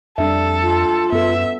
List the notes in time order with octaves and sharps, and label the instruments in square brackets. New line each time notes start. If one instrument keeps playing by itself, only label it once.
[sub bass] F2 [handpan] G3 D4 E5 [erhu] A4
[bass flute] F4
[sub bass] F#2 [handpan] B3 A4 [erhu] E5